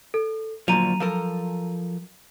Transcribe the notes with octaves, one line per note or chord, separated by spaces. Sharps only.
A4
D2 A#2 F3 F#3 A#5 D#7 F7
F3 A4 A#4